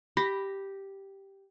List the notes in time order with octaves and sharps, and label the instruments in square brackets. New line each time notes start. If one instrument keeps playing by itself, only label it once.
[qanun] G4 [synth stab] B5 A#6